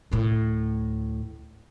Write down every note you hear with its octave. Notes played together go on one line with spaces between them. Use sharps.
D2 A2